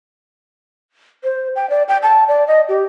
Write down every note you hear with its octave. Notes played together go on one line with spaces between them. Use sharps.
C5
G5
D5
G5
A5
D5
D#5
G4